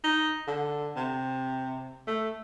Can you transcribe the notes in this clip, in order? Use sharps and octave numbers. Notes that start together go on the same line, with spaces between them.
D#4
D3
C3
A3